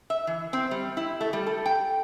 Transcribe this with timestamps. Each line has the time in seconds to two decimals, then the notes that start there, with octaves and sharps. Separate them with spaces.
0.10 E5
0.27 E3
0.53 C4
0.71 G3
0.97 E4
1.21 A3
1.33 G3
1.47 A4
1.66 G5